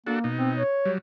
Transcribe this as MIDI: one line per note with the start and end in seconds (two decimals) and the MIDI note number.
0.07 0.28 58
0.07 0.19 62
0.07 0.19 66
0.07 0.19 69
0.24 0.63 47
0.24 0.63 63
0.38 0.51 60
0.57 0.92 73
0.85 0.98 54
0.85 0.98 55